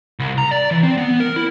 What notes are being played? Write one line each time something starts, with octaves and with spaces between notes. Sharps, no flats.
C2
A#5
D5
E3
C4
B3
A#4
E4